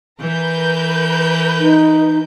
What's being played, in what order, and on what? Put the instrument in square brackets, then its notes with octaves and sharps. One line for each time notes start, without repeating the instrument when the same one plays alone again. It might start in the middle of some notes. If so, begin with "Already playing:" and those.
[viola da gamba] E3 [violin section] A#4 B4 G6
[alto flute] D#4